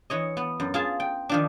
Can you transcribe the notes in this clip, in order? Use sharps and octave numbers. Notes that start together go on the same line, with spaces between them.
E3 C#5 D#5
B3
F#2
F4 G#4 A5
G5
D#3 F3 D4